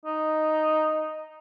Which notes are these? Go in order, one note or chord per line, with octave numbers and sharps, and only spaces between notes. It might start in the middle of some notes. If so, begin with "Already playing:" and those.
D#4